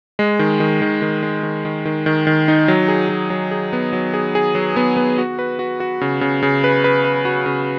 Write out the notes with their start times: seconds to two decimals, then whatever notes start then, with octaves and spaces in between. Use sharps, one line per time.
0.19 G#3
0.39 D#3
0.60 D#3
0.82 D#3
1.02 D#3
1.23 G#3
1.43 D#3
1.65 D#3
1.85 D#3
2.06 D#3
2.27 D#3
2.48 D#4
2.68 F#3
2.88 G#4
3.09 F#3
3.30 F#3
3.51 G#4
3.73 B3
3.93 F#3
4.14 G#4
4.35 G#4
4.55 F#3
4.76 B3
4.97 B3
5.18 F#4
5.39 B4
5.59 F#4
5.80 F#4
6.01 C#3
6.21 C#3
6.42 C#3
6.64 B4
6.84 B4
7.05 B4
7.25 F#4
7.46 C#3